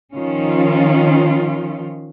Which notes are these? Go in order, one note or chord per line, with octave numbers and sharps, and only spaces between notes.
D#3 F3 C#4 F4